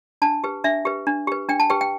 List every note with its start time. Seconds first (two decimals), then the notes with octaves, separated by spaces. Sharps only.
0.22 D4 A5
0.44 G4 B4
0.64 D4 E5
0.85 G4 B4
1.07 D4
1.27 G4 B4
1.49 D4 G5
1.60 A5
1.70 G4 B4 G5
1.81 G5